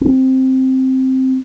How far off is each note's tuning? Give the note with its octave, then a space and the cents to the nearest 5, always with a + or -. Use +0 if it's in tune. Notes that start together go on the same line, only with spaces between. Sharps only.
C4 +0